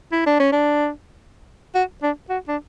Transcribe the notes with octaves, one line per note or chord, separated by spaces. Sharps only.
E4
D4
C#4
D4
F#4
D4
F#4
D4